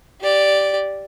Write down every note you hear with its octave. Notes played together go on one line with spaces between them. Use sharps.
G4 D5